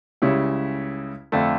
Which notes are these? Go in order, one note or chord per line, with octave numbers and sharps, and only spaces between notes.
C#2 C#3 G3 C#4 E4
F2 D3 A3 D4